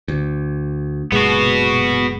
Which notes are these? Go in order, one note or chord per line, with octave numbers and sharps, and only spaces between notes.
D2
F#1 A#2 G#3 B3 F#4